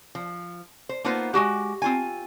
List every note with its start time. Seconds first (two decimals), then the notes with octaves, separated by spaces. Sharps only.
0.15 F3
0.89 C5
1.04 A#3 B3 D#4 F4 B4 C5
1.34 G#3 C4 F#4 G4
1.82 C4 F4 G#5